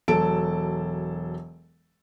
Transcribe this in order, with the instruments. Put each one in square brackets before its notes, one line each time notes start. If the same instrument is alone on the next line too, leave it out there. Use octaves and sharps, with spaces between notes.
[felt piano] E1 F#3 A4 A5 D7